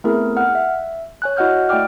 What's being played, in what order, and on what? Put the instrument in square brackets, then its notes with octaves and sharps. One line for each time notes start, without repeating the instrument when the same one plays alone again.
[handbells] A3 B3 C4 E4 G#4 A#4
F#5 F6 F#6
E5
C#5 G#5 F#6
E4 F#4 D#5 F#5 F6 G6
A3 E4 D5 G5 D6 F6